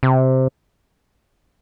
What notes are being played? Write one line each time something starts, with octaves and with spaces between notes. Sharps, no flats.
C3